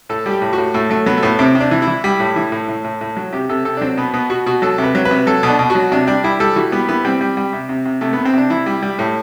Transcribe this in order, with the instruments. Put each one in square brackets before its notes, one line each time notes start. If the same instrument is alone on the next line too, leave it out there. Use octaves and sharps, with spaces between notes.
[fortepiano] A2 A4
G3
G4
A2
F#4
A2
A2 A3
F#3 A3
F#3 B3
A3
A2 B3
C3 C4
C3
D4
E3
E4
E3
G3
A2
E3
A2
A2
A2
A2
F#3
C3 G4
C3 A4
C3 A4
D4
F#3 C4
B2 B3
B2 B3
B2 F#4
B2 F#4
F#3 A4
C3
B4
F#3
B4
C3
F#3 A4
B2
D4
B2
F#4
F#3
C3 D4
G3 D4
G3 E4
G3 A4
E3 F#4
G3 B3
E3 B3
G3 C4
G3
G3
C3
C3
C3
C3 A3
C3 B3
C4
C3 D4
E3 E4
G3
G3
A2